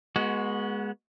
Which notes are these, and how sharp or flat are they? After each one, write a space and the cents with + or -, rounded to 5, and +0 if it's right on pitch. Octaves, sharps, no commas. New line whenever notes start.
G#3 +0 B3 -30 F#4 +0